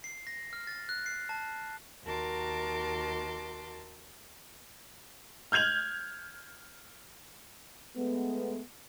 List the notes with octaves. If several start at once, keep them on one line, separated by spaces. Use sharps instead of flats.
C7
A#6
F6
A6
F#6
C7
A5
D#2 F#4 A#4 A5 C6 D6
F6 G6 G#6 F7 F#7
G#3 A3 B3